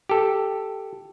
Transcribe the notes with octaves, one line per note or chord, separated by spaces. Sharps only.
G4 A4